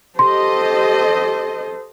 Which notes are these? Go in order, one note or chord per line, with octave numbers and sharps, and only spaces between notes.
G4 A4 C5 D#5 C6